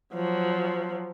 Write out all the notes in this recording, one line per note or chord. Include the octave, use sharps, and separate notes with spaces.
F3 F#3